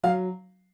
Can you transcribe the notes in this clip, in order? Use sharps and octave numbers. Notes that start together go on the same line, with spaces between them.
F#3 F5